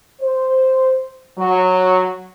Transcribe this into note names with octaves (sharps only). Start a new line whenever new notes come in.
C5
F#3